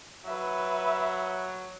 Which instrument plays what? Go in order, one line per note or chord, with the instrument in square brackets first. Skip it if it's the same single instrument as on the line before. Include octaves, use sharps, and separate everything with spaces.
[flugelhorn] F#3 [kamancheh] B4 E5